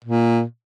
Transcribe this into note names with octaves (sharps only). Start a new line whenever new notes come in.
A#2